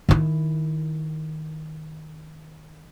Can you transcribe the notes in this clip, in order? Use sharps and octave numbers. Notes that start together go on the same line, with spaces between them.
D#3 E4